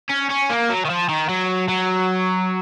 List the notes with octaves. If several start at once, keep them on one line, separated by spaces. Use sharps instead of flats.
C#4
C#4
A#3
F#3
D#3
F3
D#3
F#3
F#3